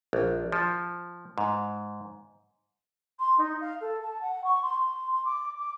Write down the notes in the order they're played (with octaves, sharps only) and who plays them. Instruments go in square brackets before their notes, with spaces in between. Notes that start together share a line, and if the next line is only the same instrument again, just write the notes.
[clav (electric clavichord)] A#1
F3
G#2
[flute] C6
D#4
F5
A4
A5
F#5
C#6
C6
C6
D6
D6